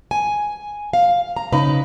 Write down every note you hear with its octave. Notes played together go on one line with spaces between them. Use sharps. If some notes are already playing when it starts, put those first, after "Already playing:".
G#5
F5
A#5
C#3 D#4 B4